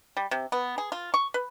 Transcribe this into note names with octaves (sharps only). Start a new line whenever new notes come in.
G3
C3
B3
G#4
F4
C#6
B4